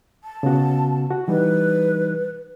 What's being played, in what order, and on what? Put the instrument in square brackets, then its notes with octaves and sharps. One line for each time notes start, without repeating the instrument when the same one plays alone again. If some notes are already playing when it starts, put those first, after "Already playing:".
[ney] A5
[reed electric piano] C#3 B3 F#4
F#4
[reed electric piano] E3 G3 D#4 [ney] B4